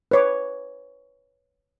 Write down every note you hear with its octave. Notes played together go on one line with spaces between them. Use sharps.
B4 C#5 D6